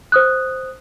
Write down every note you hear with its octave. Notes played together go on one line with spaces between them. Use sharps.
C5 D#6 F#6